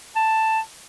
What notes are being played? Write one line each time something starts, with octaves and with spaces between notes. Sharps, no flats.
A5